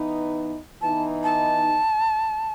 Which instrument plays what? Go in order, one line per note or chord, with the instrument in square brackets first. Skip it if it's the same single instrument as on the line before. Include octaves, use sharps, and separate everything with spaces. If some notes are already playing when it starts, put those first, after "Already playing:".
Already playing: [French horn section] E3 B3 D#4
[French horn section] E3 B3 D#4 [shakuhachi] A5
[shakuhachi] A5